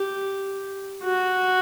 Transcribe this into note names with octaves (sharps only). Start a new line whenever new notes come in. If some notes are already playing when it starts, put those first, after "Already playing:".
Already playing: G4
F#4